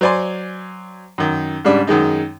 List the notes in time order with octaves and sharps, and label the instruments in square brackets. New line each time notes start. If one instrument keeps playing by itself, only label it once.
[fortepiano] F#3 C5 D5 G#5 C6
F#2 D#3
G#2 C#3 G3 D4
F#2 D#3 G#3 D#4